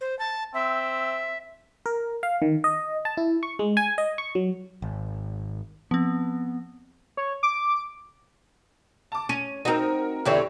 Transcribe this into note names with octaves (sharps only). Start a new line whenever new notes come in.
C5
A5
C4 E5
A#4
F5
D#3
D#5
A5
E4
C#6
G#3
G#5
D#5
C#6
F#3
G#1
F3 B3 C4
C#5
D6
A5 D6
C#4 D#7
C4 D#4 F#4 A#4
E2 D3 C4 G4 C#5 E5